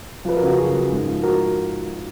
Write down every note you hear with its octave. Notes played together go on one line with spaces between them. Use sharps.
F3 B4
F#4 A#4
C#3
F#4
F#2 G#4
F#2
G#2
F3
F#4 A#4